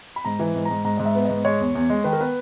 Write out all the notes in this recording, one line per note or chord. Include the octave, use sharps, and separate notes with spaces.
B5
G#2 A#5
E3
G#2
G#2 A#5
G#2 A#5
G#2 D#5
E5
B3
G#2 D#5
G#3 C#5
E2
E2
G#3
D#3 B4
A#4
B3 B4